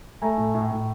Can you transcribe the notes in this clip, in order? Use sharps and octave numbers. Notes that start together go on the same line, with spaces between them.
A3 G#5 A#5
A2
A2
A2